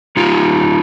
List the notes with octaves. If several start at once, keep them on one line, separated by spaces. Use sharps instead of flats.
G#3 D#4 F4